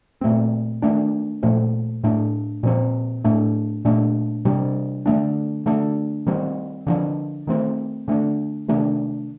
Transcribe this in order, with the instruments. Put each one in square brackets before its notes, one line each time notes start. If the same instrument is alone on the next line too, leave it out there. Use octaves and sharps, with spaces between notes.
[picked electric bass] A#2 A3 C4
D#3 A3 D4
A#2 F3 A3
A2 A3 D4
A#2 F3 C4
A2 A3 D4
A#2 A3 D4
C3 G3 D4
D3 A3 D4
D3 A3 D4
D#3 G3 C4
D3 F3 A3 D4
D#3 A3 C4
D3 A3 D4
C3 D#3 A3 D4